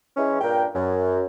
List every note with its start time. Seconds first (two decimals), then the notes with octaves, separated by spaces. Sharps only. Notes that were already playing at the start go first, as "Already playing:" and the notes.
0.17 E3 G#3 C#4
0.41 G2 A#2 D4 A#4 G5
0.75 F#2